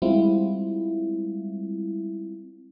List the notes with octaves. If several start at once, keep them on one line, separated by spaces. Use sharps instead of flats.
G3 G#3 C4 E4 F4